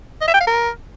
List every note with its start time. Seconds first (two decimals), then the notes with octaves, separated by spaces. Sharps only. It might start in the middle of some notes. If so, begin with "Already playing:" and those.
0.21 D#5
0.28 E5
0.34 G5
0.41 F5
0.47 A#4